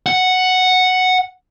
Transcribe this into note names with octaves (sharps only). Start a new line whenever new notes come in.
F#5